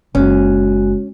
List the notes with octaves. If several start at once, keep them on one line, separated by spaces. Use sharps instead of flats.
F#1 G#3 C#4 F#4